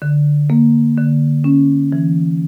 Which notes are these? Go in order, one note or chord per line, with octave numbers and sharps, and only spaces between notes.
D3
A#3
D3
C#4
E3